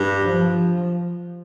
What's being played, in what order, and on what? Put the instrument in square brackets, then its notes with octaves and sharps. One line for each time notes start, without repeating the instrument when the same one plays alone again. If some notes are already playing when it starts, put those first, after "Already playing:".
Already playing: [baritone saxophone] G2
[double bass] F3